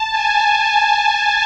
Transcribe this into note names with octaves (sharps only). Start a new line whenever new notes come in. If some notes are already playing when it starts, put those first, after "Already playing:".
Already playing: A5
G#5